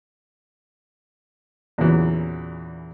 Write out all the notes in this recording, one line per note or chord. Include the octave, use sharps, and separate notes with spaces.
E2 A#2 C#3 E3 F#3